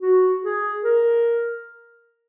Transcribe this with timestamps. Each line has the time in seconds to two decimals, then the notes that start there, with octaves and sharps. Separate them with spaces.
0.02 F#4
0.44 G#4
0.84 A#4